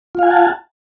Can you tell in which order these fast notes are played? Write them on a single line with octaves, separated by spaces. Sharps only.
F4 F5 G#5 F#5 A5